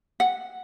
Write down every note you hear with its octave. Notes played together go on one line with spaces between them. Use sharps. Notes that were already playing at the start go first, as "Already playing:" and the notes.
F#5